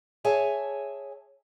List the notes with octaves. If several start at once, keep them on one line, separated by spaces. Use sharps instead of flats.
G#4 C#5 E5 G#5 A5